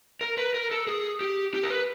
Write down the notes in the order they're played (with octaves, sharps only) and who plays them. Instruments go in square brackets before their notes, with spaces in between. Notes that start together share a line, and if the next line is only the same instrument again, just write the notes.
[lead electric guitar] A#4
B4
A#4
A4
G#4
G4
G4
A#4
B4